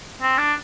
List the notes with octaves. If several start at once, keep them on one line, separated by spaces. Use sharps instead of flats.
C4
D4